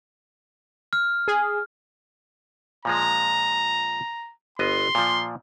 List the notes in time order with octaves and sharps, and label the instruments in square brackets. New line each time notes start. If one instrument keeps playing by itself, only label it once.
[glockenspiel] F6
[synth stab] G#4
[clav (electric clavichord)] A#2 F3 G#3 [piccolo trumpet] A#5
[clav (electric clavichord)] G1 B3 D#5 [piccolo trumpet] C6
[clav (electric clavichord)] A#2 F3